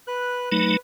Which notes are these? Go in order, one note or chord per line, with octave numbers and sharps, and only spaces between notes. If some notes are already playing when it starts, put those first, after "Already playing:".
B4 F#6
F#3 A3 D#4 B4